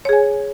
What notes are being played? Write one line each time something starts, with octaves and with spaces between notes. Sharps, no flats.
G#4 C#5 G#5